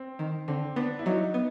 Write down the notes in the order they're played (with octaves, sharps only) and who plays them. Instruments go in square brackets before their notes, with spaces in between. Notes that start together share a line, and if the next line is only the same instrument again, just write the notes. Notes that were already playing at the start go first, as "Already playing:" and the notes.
Already playing: [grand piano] C4
[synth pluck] D#3
[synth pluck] D3 [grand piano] C4
[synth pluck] B3 [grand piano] D4
[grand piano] E4
[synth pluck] F#3 [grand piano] D#4
[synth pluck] B3